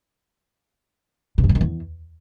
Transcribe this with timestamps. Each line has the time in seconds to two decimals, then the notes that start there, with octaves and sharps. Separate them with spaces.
1.38 B2
1.44 F#2
1.49 B2
1.55 D#3
1.61 E2